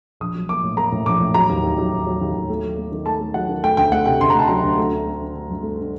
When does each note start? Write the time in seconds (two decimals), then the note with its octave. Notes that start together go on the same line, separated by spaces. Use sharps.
0.20 A#1 D#6
0.35 F#3
0.49 A#3 D6
0.63 A2
0.77 A#3 A#5
0.92 A2
1.06 A#1 D6
1.20 A2
1.34 F#3 A#5
1.49 D#2
1.63 D#2
1.78 F#3
1.92 D#2
2.07 F#3
2.21 D#2
2.35 D#2
2.49 A3
2.63 F#3
2.78 A3
2.92 D#3
3.06 A3 A5
3.20 A3
3.34 F#3 F#5
3.48 D#3
3.63 A3 G5
3.77 D2 G5
3.92 A3 F#5
4.06 C3 G5
4.21 D2 C6
4.30 A#5
4.35 A3 A5
4.48 F#3 A#5
4.63 D2
4.78 A3
4.93 D4
5.06 A3
5.21 D3
5.34 D3
5.50 G2
5.63 A3
5.78 D4